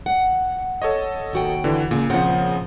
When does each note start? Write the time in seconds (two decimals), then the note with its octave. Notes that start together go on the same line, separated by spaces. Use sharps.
0.06 F#5
0.82 A4 C#5 D#5
1.33 D#2 F#4 G5
1.64 D3 E3
1.91 A#2 C#3
2.10 A#2 C#3 F3 C4 F#5